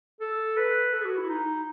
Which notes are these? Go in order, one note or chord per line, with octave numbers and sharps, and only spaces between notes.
A4
B4
A4
G#4
F#4
E4
D#4